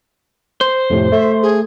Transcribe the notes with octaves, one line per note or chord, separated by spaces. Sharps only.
C5
F2 A2 C3
A3 E5
G#4